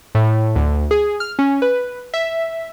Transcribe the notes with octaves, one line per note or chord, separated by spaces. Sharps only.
A2
D2
G#4
F6
C#4
B4
E5